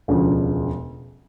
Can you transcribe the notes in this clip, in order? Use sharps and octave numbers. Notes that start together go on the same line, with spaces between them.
E1 D2 C#3 F3